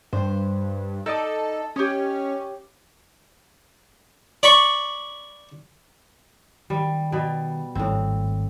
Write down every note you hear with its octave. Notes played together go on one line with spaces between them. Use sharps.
G2 C5
D#4 A4 D5 D#5
C#4 G4 C#5 D#5
D5 B5 C#6
D#3 G3
B2 G3
G#1 A2 G3 C4